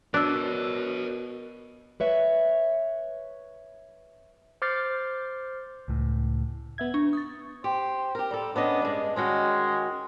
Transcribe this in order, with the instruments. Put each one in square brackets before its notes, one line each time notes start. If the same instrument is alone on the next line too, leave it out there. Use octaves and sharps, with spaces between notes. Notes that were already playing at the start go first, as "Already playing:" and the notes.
[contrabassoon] B2 [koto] D4 [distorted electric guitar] A#4 C#5 [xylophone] E6 F#6
[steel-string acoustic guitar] B4 C#5 E5
[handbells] C5 D6 F6 G6 A6 C7
[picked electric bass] C#2 A2
[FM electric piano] B3 E5 G#6
[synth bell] D4 [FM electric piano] C#6
[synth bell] D#6 A6
[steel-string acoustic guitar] G4 [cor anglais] C5
[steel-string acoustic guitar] G4 A#4
G3 A4
[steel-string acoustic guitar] B3 C#4 D#5 [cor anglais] D4
[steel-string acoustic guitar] G2 G#3
[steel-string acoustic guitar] D#3 C#4 F#4 [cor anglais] G#3